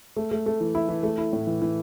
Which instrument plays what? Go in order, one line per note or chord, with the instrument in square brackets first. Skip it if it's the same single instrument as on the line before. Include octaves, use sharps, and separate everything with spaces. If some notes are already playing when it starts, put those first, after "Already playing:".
[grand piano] A3
A3
A3
E3
E4
E3
A3
E4
A2
E3
E3